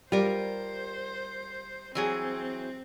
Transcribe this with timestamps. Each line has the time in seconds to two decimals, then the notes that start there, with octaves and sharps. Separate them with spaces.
0.12 G3 F4 A#4 C5
1.95 E3 F#3 C4 G#4